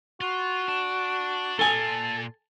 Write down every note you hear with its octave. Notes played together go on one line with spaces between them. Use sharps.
F4 F#4
D5 A5
A#2 F4 A4 G#5